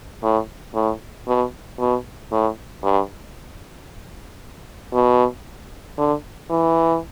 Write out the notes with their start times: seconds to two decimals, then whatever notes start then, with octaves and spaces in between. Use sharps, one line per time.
0.22 A2
0.74 A2
1.27 B2
1.79 B2
2.31 A2
2.83 G2
4.93 B2
5.98 D3
6.50 E3